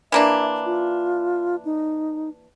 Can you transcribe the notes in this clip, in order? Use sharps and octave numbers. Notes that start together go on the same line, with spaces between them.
E3 A#3 D4 E5
F4
D#4